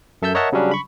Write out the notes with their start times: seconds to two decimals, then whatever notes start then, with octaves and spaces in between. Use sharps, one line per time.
0.22 F#2 A4 E5 A5 E6 G6
0.34 A#4 C#5 D#5 E5 F#5 A5
0.52 C#3 F#3 G3 C#4 D4
0.71 B5 C#6